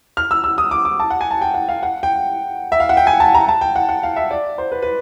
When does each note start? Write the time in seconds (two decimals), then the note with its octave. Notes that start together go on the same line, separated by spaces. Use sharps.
0.17 F6
0.31 E6
0.44 E6
0.58 D#6
0.71 D6
0.85 D6
1.00 A5
1.10 F#5
1.21 G#5
1.31 A5
1.42 G5
1.54 F#5
1.69 F5
1.83 F#5
2.03 G5
2.72 E5
2.80 F5
2.89 F#5
2.97 G5
3.07 G#5
3.20 A5
3.35 A#5
3.48 A5
3.61 G5
3.76 F#5
3.89 F#5
4.03 F5
4.16 E5
4.31 D5
4.58 C5
4.72 B4
4.82 B4